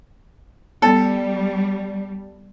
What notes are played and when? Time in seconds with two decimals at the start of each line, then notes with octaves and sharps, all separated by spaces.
0.82 G3 B3 A4